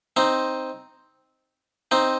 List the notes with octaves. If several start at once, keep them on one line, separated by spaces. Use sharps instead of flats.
C4 D#4
C4 D#4